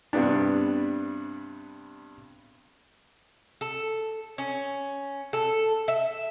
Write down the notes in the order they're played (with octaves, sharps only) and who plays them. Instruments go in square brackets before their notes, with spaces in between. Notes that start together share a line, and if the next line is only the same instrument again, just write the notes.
[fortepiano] G2 C3 B3 D4
[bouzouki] A4
C#4
A4
E5